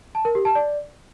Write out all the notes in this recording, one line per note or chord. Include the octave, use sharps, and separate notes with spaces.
A5
A#4
G4
A5
D5